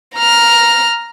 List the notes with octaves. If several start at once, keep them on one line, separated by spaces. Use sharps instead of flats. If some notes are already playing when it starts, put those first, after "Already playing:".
A#5 F6